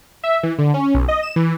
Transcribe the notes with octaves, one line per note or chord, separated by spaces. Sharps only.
E5
E3
D3
C#4
B1
D#5
E7
E3